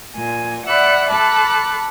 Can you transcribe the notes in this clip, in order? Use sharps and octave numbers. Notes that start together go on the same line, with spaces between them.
A#2 G#5
D5 E5 F#5 B5 E6 F#6
A4 A5 B5 D6 F#6